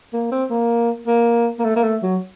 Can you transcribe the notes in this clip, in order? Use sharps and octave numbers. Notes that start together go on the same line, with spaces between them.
A#3
C4
A#3
A#3
A#3
A3
A#3
A3
F#3